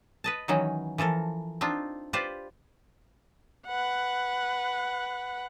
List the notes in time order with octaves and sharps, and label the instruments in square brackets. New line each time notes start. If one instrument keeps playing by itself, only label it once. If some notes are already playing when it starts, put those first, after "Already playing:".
[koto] B4 D#5 A5
D#3 E3 F#3 C#4 D#4
E3 F3 A4 A#4
C4 D4 D#4 F4
F4 G4 B4 C5 D5
[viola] B4 F#5